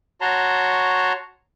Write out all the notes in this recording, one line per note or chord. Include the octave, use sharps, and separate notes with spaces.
F#4 C#5 A5 A#5 C6